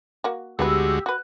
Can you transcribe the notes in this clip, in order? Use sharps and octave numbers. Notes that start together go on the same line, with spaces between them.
A#3 F#4
D2 G#3 B3 E4 F#4 G4 B4 E6
F#4 B4 F#6